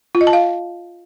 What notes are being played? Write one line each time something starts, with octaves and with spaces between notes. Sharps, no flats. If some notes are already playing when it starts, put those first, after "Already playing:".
F4
D#5
A5
F5